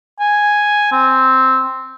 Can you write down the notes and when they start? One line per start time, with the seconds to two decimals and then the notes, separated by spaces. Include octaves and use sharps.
0.20 G#5
0.92 C4